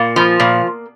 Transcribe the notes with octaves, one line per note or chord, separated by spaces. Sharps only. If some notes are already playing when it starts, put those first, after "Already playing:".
Already playing: A#2 A#3
F3
A#2